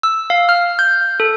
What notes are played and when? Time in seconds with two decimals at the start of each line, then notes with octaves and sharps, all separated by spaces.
0.03 E6
0.30 F5
0.49 F6
0.79 G6
1.20 A4